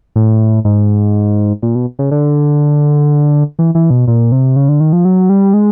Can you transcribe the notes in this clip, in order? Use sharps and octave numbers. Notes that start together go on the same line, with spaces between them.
A2
G#2
A#2
B2
C#3
D3
E3
E3
B2
A#2
C3
C#3
D3
D#3
F3
F#3
G3
G#3